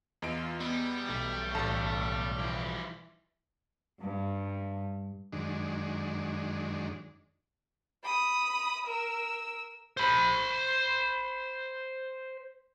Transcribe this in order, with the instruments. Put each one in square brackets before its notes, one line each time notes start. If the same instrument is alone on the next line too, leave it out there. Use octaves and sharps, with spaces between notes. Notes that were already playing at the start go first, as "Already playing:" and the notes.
[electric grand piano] E2 D#5 D7 [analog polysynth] F4
[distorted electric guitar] G3 [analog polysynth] B3
[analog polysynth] B1 [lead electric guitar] A3
[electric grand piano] A1 A4 A5
[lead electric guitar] E3 F3
[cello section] G2
[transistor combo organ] F#2 D#3 G#3 D4
[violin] B5 D#6
A#4 E6
[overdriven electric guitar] C5 B5